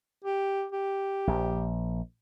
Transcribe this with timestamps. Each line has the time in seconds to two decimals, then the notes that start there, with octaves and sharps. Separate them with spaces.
0.24 G4
0.72 G4
1.27 A#1